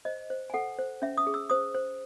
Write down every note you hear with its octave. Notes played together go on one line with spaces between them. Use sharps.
C5 D#5
C5
G#5
A4 F#5
C5
C#4 E5
D#6
G#4
E6
C5 D#6
C5